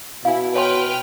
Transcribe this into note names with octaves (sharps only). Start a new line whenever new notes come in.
B2 E4 F5 G#5
B4 C#5 G5 G#5 C6 F6